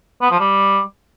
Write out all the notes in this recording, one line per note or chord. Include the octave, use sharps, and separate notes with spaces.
B3
F3
G3